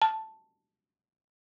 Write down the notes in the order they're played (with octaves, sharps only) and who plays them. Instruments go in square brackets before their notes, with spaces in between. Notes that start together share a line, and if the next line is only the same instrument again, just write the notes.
[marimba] A5